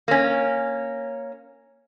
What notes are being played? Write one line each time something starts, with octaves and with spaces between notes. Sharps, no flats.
A#3 C#4